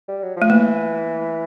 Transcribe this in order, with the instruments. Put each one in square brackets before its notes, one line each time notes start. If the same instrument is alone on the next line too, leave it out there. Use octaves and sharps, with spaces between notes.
[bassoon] G3
F#3
F3
[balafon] A3
[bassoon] E3 [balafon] A#3